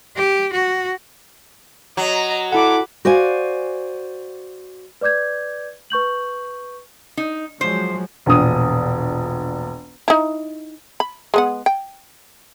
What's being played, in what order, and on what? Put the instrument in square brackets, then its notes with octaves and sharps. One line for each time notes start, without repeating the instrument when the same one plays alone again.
[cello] G4
F#4
[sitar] F#3 [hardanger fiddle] D#5 A#5
[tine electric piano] E4 F#5 [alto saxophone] A4 [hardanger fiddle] B5 D6
[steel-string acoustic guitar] F#4 C5 D5 F5 G#5
[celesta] B4 D5 D6 G6 G#6
B4 C#6 G6 F#7
[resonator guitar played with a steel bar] D#4
[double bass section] F3 F#3 G#3 [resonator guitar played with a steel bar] C5
[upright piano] E1 A#1 D#6
[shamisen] D#4 E4
B5
G#3 B3 F#5
G5